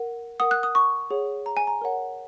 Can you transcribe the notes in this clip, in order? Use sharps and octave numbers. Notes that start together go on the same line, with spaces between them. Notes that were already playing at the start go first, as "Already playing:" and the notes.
Already playing: A#4 F#5
A#4 F#5 D#6
F#6
D#6
C#6
G#4 C#5 F#5
A#5
G#5
A#5
A#4 C#5 F#5